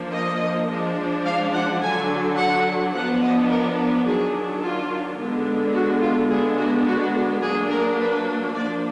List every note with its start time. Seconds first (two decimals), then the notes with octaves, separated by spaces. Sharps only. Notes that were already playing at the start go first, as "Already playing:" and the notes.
Already playing: F3 A#3 D4
0.13 D#5
0.70 F3 G#3 D4
1.25 F5
1.53 F#5
1.82 D3 F#3 D4 G#5
2.37 F#5
2.94 F3 B3 D4 F#5
3.21 D#5
3.49 A#4
4.06 D#3 F#3 D4 G#4
4.62 F4
5.18 D3 G#3 B3 D4
5.74 F#4
6.02 F4
6.30 D3 G#3 B3 D4 G#4
6.58 F#4
6.86 F#4
7.42 F#3 A#3 D4 G#4
7.70 A#4
7.99 B4
8.54 F3 A#3 D4 D5